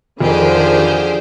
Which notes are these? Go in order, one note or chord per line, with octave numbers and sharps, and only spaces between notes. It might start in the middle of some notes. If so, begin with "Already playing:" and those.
F2 D3 D#3 F3 G4 G#4 C5